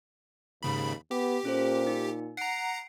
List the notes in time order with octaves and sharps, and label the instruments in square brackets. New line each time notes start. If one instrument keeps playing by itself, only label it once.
[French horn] D#2 [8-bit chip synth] G#2 C#3 B5
[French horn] B3 [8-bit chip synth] G4
[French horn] A#2 [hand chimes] C#4 A4 C5
[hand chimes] D#4
[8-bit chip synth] F#5 A#5 [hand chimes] C7 D7